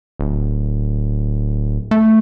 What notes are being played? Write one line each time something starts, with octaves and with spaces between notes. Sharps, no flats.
D1
A3